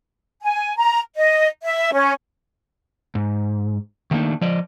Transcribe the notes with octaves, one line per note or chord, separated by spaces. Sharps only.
G#5
A#5
D#5
E5
C#4
G#2
D#3 A3 A#3 D4 D#4
F3 D5 D#5